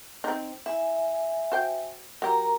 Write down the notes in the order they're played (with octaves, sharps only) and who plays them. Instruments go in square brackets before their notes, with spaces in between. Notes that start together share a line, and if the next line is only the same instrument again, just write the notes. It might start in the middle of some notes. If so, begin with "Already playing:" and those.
[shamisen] C4 D#4
[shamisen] E4 [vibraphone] E5 G#5
[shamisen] F#4 C5 G5
[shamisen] F#3 G4 [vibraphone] A#4 A#5